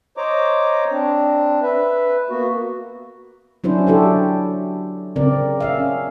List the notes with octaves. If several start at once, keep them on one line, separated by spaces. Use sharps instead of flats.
C5 C#5 D#5 A#5 D6
C4 D4
B4 E5
A#3 B3 F#4
F#3 C#4 D4 E4 F#4 C5
D4 E4 G4 A4 C#5
C#3 C4 A#4 D5
C#4 E5 F5